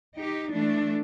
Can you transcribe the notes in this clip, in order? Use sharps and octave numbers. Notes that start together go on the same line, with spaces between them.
D#4 G4
E3 A3 D4